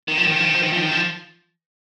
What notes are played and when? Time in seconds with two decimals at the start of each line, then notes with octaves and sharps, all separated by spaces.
0.08 D#3
0.18 F3
0.27 D#3
0.36 F3
0.45 D#3
0.54 F3
0.63 D#3
0.73 F3
0.82 D#3
0.91 F3